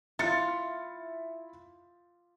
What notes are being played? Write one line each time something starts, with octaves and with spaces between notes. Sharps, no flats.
E4 F4 A6 C#7